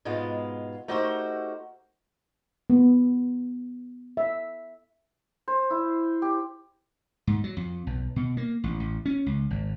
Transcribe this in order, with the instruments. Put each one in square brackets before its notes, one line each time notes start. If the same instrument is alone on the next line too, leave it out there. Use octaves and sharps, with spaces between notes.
[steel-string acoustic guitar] G#2 B2 G#3 B3 F4
A3 D#4 F#4 G4 A#4 C5
[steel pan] B3
E5
[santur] C5
E4
G4
[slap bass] G#2
F#3
F2
B1
B2
A#3
A1
A1
C#4
C#2
G#1